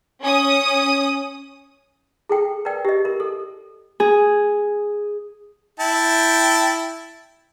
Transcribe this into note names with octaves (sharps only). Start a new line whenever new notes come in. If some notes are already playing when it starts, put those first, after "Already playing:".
C#4 D#6
G#4 A4 G5
A#4 B4 D5 G5
G4 D#5
A#4
A4
G#4
E4 G5 A5